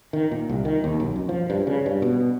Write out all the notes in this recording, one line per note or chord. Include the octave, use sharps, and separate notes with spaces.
D#3
A#2
C2
D#3
D#2
B1
F#2
F3
G2
C#3
G2
B2